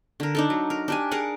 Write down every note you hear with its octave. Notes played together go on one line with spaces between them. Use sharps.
D3 A#4
D4 D#4 A4
F#3
A#4
D4 G4 G#5
G#4 A#4 D5 F#5